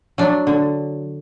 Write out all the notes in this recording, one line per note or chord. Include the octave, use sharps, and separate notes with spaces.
F#3 D4
D3